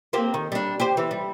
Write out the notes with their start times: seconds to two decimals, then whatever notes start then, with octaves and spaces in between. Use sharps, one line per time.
0.13 A#3 C4 G4
0.34 D#3
0.52 G3 D4
0.80 G4 C5
0.97 E3
1.11 G3